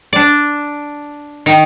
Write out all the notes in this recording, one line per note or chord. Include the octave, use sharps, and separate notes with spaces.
D4 D5
D#3